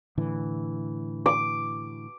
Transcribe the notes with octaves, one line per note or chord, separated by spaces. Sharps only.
A2 D3 E3
D6